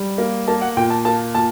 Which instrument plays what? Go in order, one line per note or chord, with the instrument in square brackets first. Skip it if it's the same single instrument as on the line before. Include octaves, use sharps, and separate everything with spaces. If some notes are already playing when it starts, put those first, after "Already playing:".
Already playing: [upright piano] G3
A#3
A#3 A5
F#5
A#2 G5
A5
A#3 A5
A#2 A5